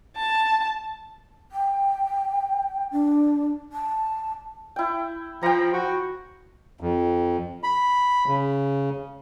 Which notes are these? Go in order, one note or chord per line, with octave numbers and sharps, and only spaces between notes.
A5
G5
D4
A5
E4 G5
F3 G5 A#5
F#4
F2
B5
C#3